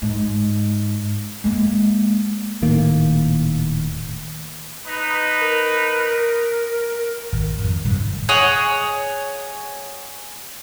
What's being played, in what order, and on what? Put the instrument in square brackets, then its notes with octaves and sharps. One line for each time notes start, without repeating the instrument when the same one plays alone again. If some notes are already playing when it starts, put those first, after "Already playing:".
[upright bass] G#2
G#3 A#3
[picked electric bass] D#1 A2 D#3 A#3
[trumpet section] D#4 B4
[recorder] A#4
[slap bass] G#1
F2
D1 G2 C3 F#3
[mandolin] G#4 C#5 D#5 F#5